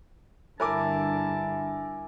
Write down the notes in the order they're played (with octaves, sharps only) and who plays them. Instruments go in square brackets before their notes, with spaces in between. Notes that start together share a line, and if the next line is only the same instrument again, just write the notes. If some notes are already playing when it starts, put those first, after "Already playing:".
[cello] G2 D3 [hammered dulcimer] E4 [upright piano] A#4 G#5 D6 [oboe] A5